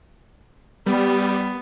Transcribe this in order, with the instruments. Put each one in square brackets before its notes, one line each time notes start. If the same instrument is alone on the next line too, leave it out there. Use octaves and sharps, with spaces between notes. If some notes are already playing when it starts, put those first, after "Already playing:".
[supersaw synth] G3 [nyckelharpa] B3